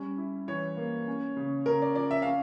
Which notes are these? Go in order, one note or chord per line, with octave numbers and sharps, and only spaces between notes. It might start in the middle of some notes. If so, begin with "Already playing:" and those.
Already playing: G3 C#4
E4
E3 C#5
A#3
C#4
C#3
C#3 A#4
D5
F3 D5
E5
C#4 F5